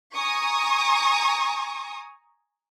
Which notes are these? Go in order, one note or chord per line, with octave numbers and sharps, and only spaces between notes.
G#5 A#5 C#6 D#6